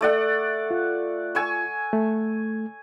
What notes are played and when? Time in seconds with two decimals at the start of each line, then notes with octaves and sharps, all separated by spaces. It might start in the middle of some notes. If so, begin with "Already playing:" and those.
0.01 A3 D5 F#5
0.71 F4
1.35 G#5 C#6 E6
1.93 A3